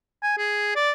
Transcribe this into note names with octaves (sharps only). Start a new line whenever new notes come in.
G#5
G#4
D5